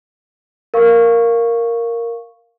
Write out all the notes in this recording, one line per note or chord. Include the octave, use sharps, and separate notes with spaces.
A#4 F5 C#6